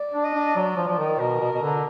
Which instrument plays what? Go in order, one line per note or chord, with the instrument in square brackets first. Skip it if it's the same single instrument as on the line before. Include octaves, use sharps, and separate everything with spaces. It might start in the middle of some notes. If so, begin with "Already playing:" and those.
Already playing: [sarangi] D5
[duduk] D4
[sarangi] D#5
[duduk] D4
[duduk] F#3 [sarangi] D5
[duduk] F3
[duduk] F3 [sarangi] D5
[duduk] D#3
[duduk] B2 [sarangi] A#4
[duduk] B2
B2
D3